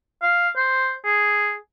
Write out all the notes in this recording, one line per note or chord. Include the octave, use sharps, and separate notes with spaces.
F5
C5
G#4